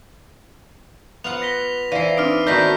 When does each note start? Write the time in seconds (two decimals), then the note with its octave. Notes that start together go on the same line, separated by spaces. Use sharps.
1.24 B3 F4 F#5 F7
1.42 A#6 B6 G7
1.92 E3 E4 D5 F5 C7 D#7
2.17 C4 D4 D#4 D5 F6 D7
2.47 D#3 A3 B3 F#4 D5 G6 A#6 B6